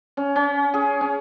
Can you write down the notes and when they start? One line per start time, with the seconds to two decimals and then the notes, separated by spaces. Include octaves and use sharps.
0.17 C#4
0.36 C#4
0.74 G#4
1.01 C#4